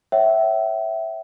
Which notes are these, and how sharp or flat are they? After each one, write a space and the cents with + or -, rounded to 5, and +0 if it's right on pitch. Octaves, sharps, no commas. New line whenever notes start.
C#5 -10 E5 +0 G5 -40